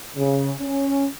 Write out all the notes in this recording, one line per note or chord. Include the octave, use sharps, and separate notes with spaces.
C#3
C#4